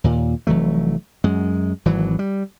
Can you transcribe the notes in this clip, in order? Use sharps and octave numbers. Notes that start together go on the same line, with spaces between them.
D#2 A#2
F1 E3 F#3 A3
F#2 G#3
G#1 E3 F#3
G3